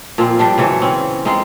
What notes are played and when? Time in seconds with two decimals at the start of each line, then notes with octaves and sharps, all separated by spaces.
0.18 A#2 F3 C4 F4
0.39 F3 G3 D4
0.58 C#3 E3 F#3
0.82 C4 C#4
1.25 G#3 C4 D#4 F4